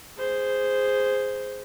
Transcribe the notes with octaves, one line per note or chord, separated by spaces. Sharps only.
G#4 C5